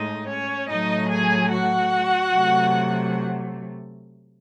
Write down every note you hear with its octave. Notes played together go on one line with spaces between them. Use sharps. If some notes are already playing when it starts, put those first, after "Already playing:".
Already playing: A2 G#3 D#4 D#5
C#4 C#5
A2 F#3 A3 D#4 D#5
G#4 G#5
F#4 F#5
C3 F#3 A3